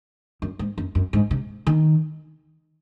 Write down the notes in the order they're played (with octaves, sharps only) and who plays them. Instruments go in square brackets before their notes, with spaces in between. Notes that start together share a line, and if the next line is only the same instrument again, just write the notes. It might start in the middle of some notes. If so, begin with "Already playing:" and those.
[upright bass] F#2
G#2
F#2
F#2
G#2
C3
D#3